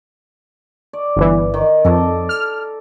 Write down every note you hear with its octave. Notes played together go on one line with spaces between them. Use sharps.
D5
G1 E3
D#3
F2 A4 D#5 D6
F6